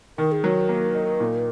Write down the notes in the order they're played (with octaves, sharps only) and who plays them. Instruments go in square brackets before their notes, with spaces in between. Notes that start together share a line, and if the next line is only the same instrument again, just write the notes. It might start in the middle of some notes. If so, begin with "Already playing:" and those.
[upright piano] D#3 [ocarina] A#4
[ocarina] G#4
[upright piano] F#3 [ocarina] A#4
[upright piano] A#3
D#4
A#2